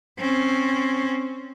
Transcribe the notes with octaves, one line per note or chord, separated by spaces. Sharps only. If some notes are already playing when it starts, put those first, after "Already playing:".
C4 C#4